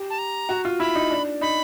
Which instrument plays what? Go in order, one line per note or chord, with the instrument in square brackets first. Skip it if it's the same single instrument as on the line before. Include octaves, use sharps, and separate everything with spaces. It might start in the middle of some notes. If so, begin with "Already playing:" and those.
Already playing: [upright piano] G4
[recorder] A5
A#5
[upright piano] F#4
F4
[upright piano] E4 [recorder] B5
[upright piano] D#4
D4
[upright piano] D#4 [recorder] B5